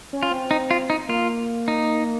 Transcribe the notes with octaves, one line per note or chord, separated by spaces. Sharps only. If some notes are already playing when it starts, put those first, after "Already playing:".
C#4
F4
C4
D#4
F4
D#4
A#3 F4
D#4